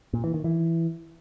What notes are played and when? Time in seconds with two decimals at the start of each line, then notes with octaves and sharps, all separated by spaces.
0.13 A#2
0.24 E3
0.34 D#3
0.44 E3